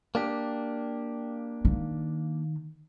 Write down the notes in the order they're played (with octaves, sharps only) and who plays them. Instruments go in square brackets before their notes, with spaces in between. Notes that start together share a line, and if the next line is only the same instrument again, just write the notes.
[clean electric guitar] A#3 D4 G4
[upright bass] D#3